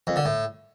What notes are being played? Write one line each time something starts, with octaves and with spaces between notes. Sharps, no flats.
F2
D3
A2